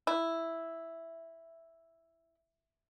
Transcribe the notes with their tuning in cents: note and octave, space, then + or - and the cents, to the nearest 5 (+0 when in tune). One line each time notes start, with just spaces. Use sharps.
E4 +0